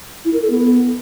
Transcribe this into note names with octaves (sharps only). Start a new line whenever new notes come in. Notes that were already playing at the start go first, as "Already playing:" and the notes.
E4
A#4
A4
B3